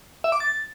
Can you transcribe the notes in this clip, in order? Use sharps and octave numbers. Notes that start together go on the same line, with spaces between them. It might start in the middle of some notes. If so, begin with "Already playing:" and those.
E5
D6
A6